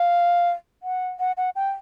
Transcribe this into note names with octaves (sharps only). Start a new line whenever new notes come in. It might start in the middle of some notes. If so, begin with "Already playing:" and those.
Already playing: F5
F#5
F#5
F#5
G5